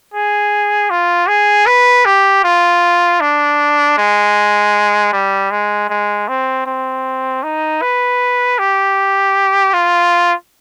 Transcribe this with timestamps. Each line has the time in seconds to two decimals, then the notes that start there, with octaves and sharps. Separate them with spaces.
0.14 G#4
0.90 F4
1.28 G#4
1.67 B4
2.06 G4
2.44 F4
3.21 D4
3.98 G#3
5.13 G3
5.51 G#3
5.90 G#3
6.29 C4
6.66 C4
7.43 D#4
7.82 B4
8.59 G4
9.74 F4